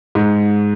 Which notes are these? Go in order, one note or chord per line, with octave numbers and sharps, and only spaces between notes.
G#2